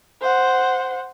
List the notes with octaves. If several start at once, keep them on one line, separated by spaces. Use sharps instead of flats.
C5 F#5